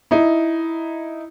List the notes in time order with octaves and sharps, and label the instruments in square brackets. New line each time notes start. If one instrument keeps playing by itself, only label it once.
[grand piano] D#4 E4